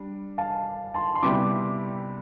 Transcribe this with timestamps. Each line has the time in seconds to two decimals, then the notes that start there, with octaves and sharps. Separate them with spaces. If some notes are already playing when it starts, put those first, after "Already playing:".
Already playing: G3 D4
0.38 F5 A5
0.94 A5 C6
1.15 C6
1.23 C3 G3 B3 E4 G4 B5 D6